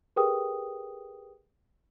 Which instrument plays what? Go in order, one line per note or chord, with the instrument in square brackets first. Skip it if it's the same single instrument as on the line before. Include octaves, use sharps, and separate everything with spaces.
[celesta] G4 G#4 A#4 B4 G5 D#6